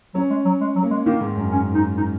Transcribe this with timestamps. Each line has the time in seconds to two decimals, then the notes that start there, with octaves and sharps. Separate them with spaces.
0.14 F#3 C#4
0.30 G#3
0.45 F#3
0.61 G#3
0.75 F#3
0.83 A#3
0.91 G#3
1.06 D#3 A#3
1.21 G#2
1.36 F#2
1.51 C#4
1.74 D#4
1.97 D#4